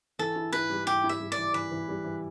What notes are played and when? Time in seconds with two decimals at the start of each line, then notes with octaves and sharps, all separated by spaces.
0.19 E3 A4
0.36 E4
0.53 E4 B4
0.70 G3
0.87 E4 G4
1.04 E4
1.09 E5
1.20 G3
1.32 D5
1.38 E3
1.54 E3 B4
1.72 E3
1.88 G3
2.04 E3